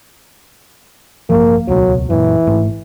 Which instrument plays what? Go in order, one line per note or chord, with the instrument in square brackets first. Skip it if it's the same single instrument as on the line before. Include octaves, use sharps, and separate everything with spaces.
[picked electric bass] A1 G2 F3 [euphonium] A#3
[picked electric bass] D#1 C#2 B2 [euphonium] F#3
[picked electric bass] F#2 A#2 [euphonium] E3
[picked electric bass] G#1 G#2 A3